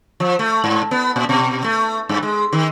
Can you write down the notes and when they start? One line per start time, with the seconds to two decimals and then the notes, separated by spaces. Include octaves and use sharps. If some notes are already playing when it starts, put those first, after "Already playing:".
0.20 F3
0.39 A3
0.64 G#2
0.91 B3
1.16 A#2
1.29 B2
1.64 A3
2.09 G2
2.23 G#3
2.52 D#3